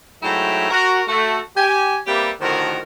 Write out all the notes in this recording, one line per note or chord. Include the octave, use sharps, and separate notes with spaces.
G#2 F#3 A3 E4 G5 A#5
F#4 A#4
A3 F#4
G4 G#5
G3 A#3 C4 G4 B4 E5
A2 D3 D#3 F3 F#4 A#4